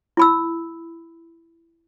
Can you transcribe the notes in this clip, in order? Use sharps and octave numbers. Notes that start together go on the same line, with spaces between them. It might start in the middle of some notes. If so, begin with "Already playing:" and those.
E4 B5 E6